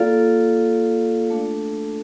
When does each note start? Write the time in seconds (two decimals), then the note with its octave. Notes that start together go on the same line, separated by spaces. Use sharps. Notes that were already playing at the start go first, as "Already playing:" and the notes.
Already playing: A#3 F4 A4 D5 F5
1.30 A3 D4 A4